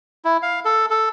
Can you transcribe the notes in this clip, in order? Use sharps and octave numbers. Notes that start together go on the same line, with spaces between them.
E4
F5
A4
A4